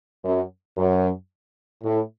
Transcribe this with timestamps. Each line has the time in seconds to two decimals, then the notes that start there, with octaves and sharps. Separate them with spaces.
0.24 F#2
0.77 F#2
1.83 A2